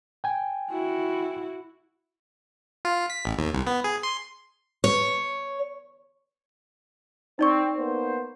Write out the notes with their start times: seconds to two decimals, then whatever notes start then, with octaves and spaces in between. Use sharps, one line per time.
0.24 G5 G#5
0.71 E4 F#4
2.85 F4
3.10 B6
3.25 A1
3.38 D#2
3.53 C2
3.67 B3
3.84 G#4
4.03 C6
4.84 C#5
7.39 C4 D#4 D5 C#6
7.76 A#3 B3 C5